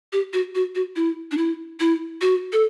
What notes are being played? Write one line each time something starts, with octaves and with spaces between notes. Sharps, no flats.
G4
F#4
F#4
F#4
E4
D4
E4
E4
F#4
A4